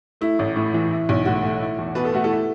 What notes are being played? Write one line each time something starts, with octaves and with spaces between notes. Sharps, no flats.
A3 E4
A1
A2
E3
E4
B1
A2 F#4
A3
E4
E2
B2 B4
A4
A3 F#4
E4 A4